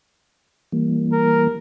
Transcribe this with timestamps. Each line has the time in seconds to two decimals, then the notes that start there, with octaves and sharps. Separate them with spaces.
0.72 E3 G3 A#3
1.13 A#4